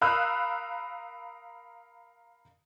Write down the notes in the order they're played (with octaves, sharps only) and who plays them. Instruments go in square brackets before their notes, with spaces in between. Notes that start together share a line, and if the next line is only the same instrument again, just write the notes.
[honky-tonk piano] A#4 F5 B5 D#6 E6 F#6